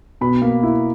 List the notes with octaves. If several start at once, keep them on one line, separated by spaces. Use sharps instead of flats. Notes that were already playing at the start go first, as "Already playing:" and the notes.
B2 B5
A#3
E4